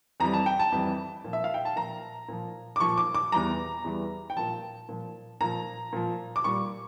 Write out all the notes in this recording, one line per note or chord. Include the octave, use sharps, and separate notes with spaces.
F2 E3 G3 A#5
A5
G5
A5
F2 E3 G3
A#2 F3
E5
F5
G5
A5
A#2 F3 A#5
A#2 F3
D6
A#2 F3 C#6
D6
D6
E2 E3 G3 A#5
E2 E3 G3
G5
A#2 F3 A5
A#2 F3
A#2 F3 A#5
A#2 F3
D6
A#2 G3 C#6